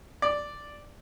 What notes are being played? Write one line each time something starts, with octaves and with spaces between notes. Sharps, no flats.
D5